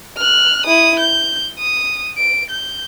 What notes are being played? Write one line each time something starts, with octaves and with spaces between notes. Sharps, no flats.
F6 F#6
E4 D#6
G6
D#6
D7
G6